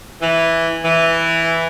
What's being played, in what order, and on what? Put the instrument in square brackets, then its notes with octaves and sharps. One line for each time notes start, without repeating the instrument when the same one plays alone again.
[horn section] E3
E3